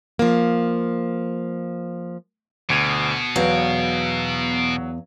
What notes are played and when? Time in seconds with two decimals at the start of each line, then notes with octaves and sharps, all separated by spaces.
0.19 F3 A#3
2.70 D2 B2 G#6 D#7
3.36 E2 F#3 F5